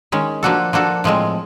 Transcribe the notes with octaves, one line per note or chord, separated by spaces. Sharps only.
D#3 G#3 C#4
F3 A#3 D4 F#4 A4
F3 A#3 D4 F#4 A4
A2 F3 G#3 C4